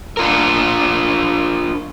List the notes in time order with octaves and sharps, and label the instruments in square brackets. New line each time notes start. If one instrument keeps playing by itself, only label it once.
[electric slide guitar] D4 F4 A#4